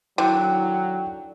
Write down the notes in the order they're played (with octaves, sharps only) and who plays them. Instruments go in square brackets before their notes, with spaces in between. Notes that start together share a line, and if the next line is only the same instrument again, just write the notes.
[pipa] D3 [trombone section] D#3 F#3 [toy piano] E4 A#4 [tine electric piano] G5